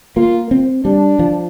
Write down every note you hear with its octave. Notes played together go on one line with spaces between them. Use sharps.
A#3 F4
C4
G3 D4
F3